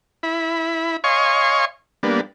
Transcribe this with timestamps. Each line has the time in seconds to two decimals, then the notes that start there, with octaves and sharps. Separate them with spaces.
0.23 E4 B5
1.04 C#5 D#5 F5 G#5 C6 C#6
2.03 G3 A#3 B3 D4